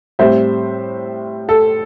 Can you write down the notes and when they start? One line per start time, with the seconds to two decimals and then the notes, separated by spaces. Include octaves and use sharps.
0.19 A2 G3 C4 C5 E5
1.49 A4